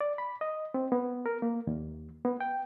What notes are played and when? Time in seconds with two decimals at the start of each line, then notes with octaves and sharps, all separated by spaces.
0.01 D5
0.18 B5
0.41 D#5
0.74 C4
0.92 B3
1.26 A#4
1.42 A#3
1.67 D#2
2.25 B3
2.41 G5